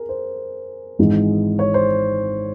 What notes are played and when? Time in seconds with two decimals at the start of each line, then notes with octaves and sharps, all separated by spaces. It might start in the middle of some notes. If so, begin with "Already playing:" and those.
Already playing: G#4 A#4
0.09 C5
0.99 G#1 G#2 E3 G#3
1.59 C#5
1.74 C5